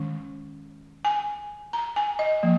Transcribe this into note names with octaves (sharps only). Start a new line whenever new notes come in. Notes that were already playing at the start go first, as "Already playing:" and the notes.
Already playing: D#3 G#3 C#4
G#5
A#5
G#5
D#5
F3 A#3